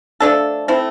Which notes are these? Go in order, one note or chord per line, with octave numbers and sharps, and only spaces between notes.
F3 A3 D4 A4
A3 C4 E4